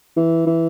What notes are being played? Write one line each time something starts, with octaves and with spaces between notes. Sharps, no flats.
E3
E3